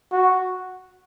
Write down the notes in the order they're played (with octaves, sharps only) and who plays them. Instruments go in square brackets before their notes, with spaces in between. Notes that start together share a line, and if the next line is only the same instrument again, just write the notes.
[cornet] F#4